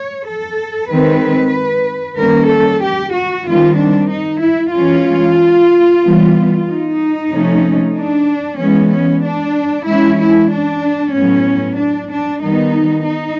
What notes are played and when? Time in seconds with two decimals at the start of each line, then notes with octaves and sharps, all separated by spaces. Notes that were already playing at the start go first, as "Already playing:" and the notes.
Already playing: C#5
0.27 A4
0.90 D#3 G#3 C4 B4
2.18 D#3 G3 A#3 C#4 A#4
2.50 A4
2.83 G4
3.14 F#4
3.47 D#3 G3 C4 F4
3.79 D4
4.10 D#4
4.43 E4
4.74 E3 G#3 C#4 F4
6.03 E3 G3 B3
6.67 D#4
7.30 C3 F3 A3 C#4
7.95 D4
8.58 E3 G#3 B3 C#4
8.92 C#4
9.23 D4
9.87 E3 G#3 C#4 E4
10.19 E4
10.51 D4
11.15 A2 F#3 B3 C#4
11.79 D4
12.12 D4
12.43 D#3 G3 B3 D#4
13.07 D#4